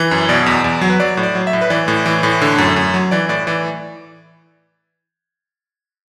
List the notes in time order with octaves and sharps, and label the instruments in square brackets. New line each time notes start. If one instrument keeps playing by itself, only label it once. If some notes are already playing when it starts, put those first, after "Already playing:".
Already playing: [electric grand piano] E3
F#2
B2 D5
E2
E2
F#3
B4
F#3 D5
A2
D5
F#3
E5
A2
B4
E3 D5
A2
E3
A2
D3
F#2
F#2
F#3
E3 D5
A2 D5
E3 D5